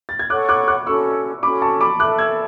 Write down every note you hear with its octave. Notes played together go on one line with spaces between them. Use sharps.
A6
G#6
A4 C#5 F#5 C#6 D6 F#6
D6 F#6
D6 F#6
C#4 F#4 A4 C#6 E6
C#4 F#4 A4 B5 D6
A5 C#6
B5 D6
A4 E5 A5 D6 F#6
E6 G#6